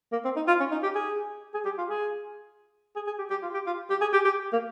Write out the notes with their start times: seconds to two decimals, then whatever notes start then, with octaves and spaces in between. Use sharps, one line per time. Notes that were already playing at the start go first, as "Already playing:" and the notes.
0.12 A#3
0.24 C4
0.36 D#4
0.47 F4
0.60 C#4
0.71 D#4
0.83 G4
0.95 G#4
1.54 G#4
1.65 G4
1.78 F4
1.89 G#4
2.96 G#4
3.07 G#4
3.18 G4
3.30 G4
3.42 F4
3.54 G4
3.66 F4
3.90 G4
4.01 G#4
4.13 G4
4.25 G4
4.52 A#3